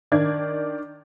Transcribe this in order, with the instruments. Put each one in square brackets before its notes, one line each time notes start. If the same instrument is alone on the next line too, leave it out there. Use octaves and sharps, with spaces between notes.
[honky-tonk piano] D#3 D4 D5 G#6